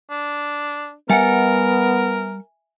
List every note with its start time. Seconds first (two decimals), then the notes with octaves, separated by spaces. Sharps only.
0.10 D4
1.10 G3 B3 A#4 E5 F#5 G#5